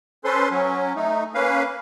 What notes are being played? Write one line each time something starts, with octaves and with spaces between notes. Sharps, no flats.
C#4 A4 B4 C5 C6
F#3 C#4
A3 D#4
A#3 C#4 B4 F5